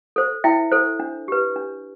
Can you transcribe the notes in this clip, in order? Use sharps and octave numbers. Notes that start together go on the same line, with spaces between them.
A4 C5
E4 E5 G5
A4 C5
D4
G4 B4
D4